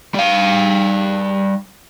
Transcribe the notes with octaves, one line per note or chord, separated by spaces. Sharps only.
G3 F5